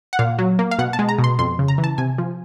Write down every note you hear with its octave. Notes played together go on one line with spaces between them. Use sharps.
F#5
A#2 F5
F#3
A#3
F5
B2 F#5
A5
G#3
A#5
B2
C6
F2 C6
C#3
A#5
E3
A5
C3 G#5
F3